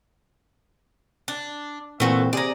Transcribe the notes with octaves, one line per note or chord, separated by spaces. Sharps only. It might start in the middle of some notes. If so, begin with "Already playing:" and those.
D4
A#2 E3 A3 C4 F#4 A4
C3 G#4 D5 A#5 D#7